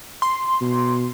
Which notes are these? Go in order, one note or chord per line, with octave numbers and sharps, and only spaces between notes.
C6
B2